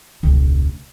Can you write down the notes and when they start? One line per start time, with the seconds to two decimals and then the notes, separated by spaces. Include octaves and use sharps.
0.23 E1 C#2